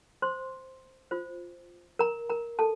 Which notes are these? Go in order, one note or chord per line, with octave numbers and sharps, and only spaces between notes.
C5 C6
F4 C5
A#4 A#5
A#4 A#5
A4 A5